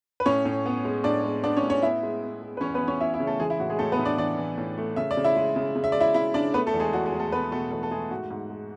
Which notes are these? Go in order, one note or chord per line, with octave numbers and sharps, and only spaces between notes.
B4
A2 C#4 C#5
A2
B3
G#3
A2 D4 D5
G#3
B3 D4 D5
C#4 C#5
A2
C#4 C#5
B3 E4 E5
G#3
B3
G#3
B4
E2 C#4 C#5
B3 B4
E2
C#4 C#5
B3 E4 E5
E4 E5
C#3
A3 A4
E3 G#3 G#4
E4
A2 F#4
G#3 G#4
A2 A3 A4
B3 B4
A2
D4 D5
E3 D4 D5
E3
A2
A3
C#3 E5
D5
C#3
E4 E5
G#3
C#3
C#3
E5
G#3 D5
E4 E5
C#3 E4 E5
C#3 D4 D5
A3 B3 B4
A3 A4
E2
G#3 G#4
E2 F#4
G#3 G#4
E2
A3 A4
A3 B3 B4
B2 A3 A4
E2 A3 A4
A4
G#3 A3 G#4
G#2 F#4
G#2
G#3